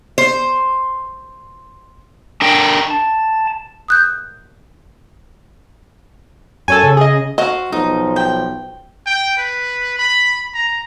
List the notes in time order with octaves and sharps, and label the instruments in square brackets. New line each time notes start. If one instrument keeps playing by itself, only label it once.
[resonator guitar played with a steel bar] C5
[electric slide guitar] D4 A#4 G5
[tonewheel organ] A5
[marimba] D#6 F#6 G6
[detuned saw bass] F#2 [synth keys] A4 C#5 G#5
[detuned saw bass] C#3
[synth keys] G#4 D#5
[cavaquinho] F#4 C5 F5 [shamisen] D#5
[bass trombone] B1 [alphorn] F3 [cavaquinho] D#4
[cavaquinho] G5
[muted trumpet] G5
B4
B5
A#5